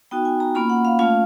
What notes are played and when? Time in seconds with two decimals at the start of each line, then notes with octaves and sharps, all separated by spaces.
0.11 B3 D#4 F#4 G5
0.25 G#5
0.40 A#5
0.55 A#3 C#4 F4 B5
0.70 F#5
0.85 F5
0.99 A3 C#4 F4 F5